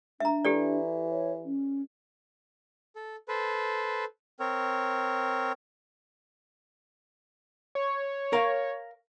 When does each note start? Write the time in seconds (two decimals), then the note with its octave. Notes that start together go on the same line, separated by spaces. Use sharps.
0.20 D4 E5 A#5
0.45 E3 G4 A4 D5
1.10 C#5
1.45 C#4
2.96 A4
3.28 A4 B4 C5
4.40 C4 A#4 C#5
7.75 C#5
8.33 A#4 F5